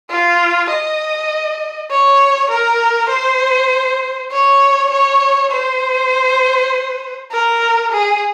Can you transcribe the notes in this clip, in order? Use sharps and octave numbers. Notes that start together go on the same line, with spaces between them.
F4
D#5
C#5
A#4
C5
C#5
C#5
C5
A#4
G#4